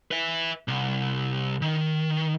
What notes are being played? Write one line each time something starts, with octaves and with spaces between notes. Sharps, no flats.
B4 E5
C2
D#3